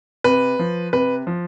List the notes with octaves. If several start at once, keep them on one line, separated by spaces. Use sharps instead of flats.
C3 B4
F3
C3 B4
F3